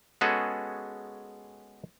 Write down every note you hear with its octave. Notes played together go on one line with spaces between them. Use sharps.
G#3 B3 C#4 F#4 G#4 A4